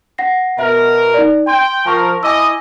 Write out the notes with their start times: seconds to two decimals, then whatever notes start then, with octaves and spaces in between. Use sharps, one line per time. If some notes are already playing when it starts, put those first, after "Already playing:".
0.18 F#5 A#6 C7
0.59 B2 A#4 E5
1.14 D#4 D5
1.47 G5 C6
1.86 F3 A#4 A5 C#6
2.23 E4 D#5 G#5 D6 E6